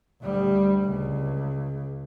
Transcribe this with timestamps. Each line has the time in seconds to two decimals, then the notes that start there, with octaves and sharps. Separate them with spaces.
0.21 D2 G3
0.84 C#2